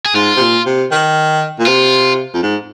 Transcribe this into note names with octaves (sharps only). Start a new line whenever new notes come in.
G#4
G#2 F4
C3
A#2
C3
D#3
A#2
C3 F4
F2
G#2